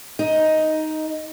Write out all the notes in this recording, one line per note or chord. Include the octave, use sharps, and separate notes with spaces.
D#4